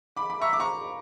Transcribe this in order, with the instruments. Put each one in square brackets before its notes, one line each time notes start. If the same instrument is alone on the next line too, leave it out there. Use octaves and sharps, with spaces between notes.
[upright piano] B5 D6
B5 D6
[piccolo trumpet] E5 [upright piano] A#5 C#6
[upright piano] D6
A#5 C#6